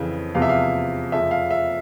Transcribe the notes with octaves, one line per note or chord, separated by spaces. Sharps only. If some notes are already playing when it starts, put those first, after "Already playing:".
Already playing: F2 C#3 E3
E2 C3 F3 F5
E5
F5
F2 C#3 F3 E5
F5
E5